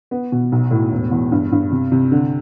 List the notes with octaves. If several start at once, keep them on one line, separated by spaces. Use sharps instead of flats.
B3
B2
B1
A2
E1
E2
G2
G2
C3
C3
D3